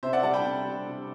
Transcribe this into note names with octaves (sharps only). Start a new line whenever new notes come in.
C3 C5 E5
D5 F#5
G3 D4 F#5 A5
G5 B5
C3
G3 D4
C3